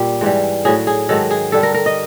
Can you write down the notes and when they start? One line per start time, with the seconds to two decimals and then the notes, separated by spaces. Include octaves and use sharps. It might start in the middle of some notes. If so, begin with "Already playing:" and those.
Already playing: A#2 G3 G4
0.21 G#2 E3 G3
0.65 A2 F#3 G#4
0.87 G#4
1.09 G#2 D#3 F#3 A4
1.31 G#4
1.52 G2 D3 G3 A4
1.63 A#4
1.74 A#4
1.86 D#5